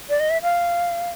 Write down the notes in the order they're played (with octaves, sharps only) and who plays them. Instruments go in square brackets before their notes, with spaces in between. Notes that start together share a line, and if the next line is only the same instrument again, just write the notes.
[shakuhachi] D5
D#5
E5
F5